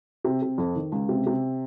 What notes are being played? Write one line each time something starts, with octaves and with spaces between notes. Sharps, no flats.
C3
C3
F2
D#3
C#2
C3
C3